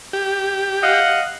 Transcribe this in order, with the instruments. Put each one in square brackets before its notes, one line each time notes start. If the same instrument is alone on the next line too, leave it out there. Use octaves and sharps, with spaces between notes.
[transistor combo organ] G4
[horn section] D#5 F5 F#5